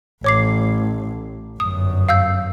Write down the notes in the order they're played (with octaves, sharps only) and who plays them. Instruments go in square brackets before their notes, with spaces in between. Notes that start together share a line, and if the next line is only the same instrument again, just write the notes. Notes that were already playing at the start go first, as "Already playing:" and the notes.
[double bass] A1 [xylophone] C#5 D6 C7
[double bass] G1 F#2 [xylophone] D#6
[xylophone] F5 E6 G6